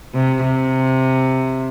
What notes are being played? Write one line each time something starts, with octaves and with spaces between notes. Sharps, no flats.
C3
C3